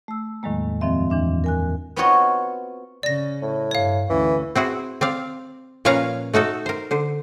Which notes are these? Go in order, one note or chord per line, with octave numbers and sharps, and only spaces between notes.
A3 E6
E2 A2 D#3 F#3 G#3 A#3
F#2 D#3 F3 C4 E5
E2 E3 D4 E5
A#4 G#5 F#6
B3 C4 F4 F#4 C#5 D#5
C#3 C#4 D5 A#6
A2
G2 C#5 F5
D2 E3 C#4
C4 E4 F#4 G#4
C4 D5 F5
A#2 F3 C#4 B4 F5 A#5
A3 D#4 F#4 A4
A#4 C5
D3 C5